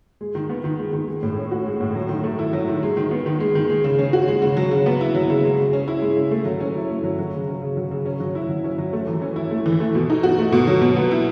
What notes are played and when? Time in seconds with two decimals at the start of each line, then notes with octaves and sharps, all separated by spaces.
0.21 G#3
0.35 D#3
0.49 B3
0.64 D#3
0.79 G#3
0.93 D#3
1.08 G#3
1.23 A2
1.37 C#4
1.51 F#4
1.66 G#3
1.80 A2
1.95 F#3
2.09 D#3
2.24 A3
2.39 E4
2.53 F#3
2.68 D#3
2.83 G#3
2.97 D#3
3.11 B3
3.26 D#3
3.40 G#3
3.55 D#3
3.70 G#3
3.84 C#3
3.99 C#4
4.13 F#4
4.28 G#3
4.42 C#3
4.57 F#3
4.71 C#3
4.86 B3
5.01 E4
5.15 F#3
5.30 C#3
5.44 G#3
5.58 C#3
5.73 C#4
5.88 E4
6.02 G#3
6.16 C#3
6.31 A3
6.45 F#3
6.60 C#4
6.75 E4
6.89 A3
7.03 F#3
7.18 F#3
7.33 C#3
7.48 C#4
7.62 C#3
7.77 F#3
7.91 C#3
8.06 C#4
8.20 F#3
8.35 E4
8.49 F#3
8.64 C#4
8.78 F#3
8.93 A3
9.07 E3
9.22 C#4
9.36 E4
9.51 A3
9.66 E3
9.80 A3
9.95 B2
10.10 D#4
10.23 F#4
10.38 A3
10.52 B2
10.67 F#3
10.81 B2
10.96 B3
11.11 E4